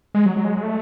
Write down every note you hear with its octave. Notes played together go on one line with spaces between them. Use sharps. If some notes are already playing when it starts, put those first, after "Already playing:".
G#3
F#3
F#3
G#3
G#3
A3